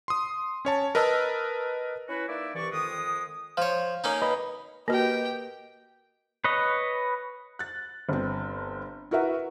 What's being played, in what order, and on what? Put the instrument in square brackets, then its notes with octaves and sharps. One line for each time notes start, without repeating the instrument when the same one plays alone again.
[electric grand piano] C6 D#6
C#4 C#5 A5
A#4 B4 D#5 A5 E6
[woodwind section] C#4 E4 F#4 B4
A#3 D#4 E4 D5 E5
C2 E3 D5 C#6
F2 D#3 G#3 D#6
[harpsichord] F3 C#5 [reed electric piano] F5
[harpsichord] A#3 C#4 D#4
[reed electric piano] B4 D#5 B5
[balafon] A#3 F#4 [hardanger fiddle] G4 G5 [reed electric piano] A#4 B4 D#5
[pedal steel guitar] B4 C#5 D#5
[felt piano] F#6 A6
G1 C4
E4 F#4 A#4 B4 E5 F#5